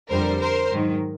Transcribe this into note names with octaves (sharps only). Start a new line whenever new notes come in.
F2 D3 G3 A#4 C5
A#4 C5
G#2 D#3 F#3